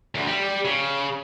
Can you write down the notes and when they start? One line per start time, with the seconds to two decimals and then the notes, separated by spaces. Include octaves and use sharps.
0.15 D2
0.27 G3
0.65 C#3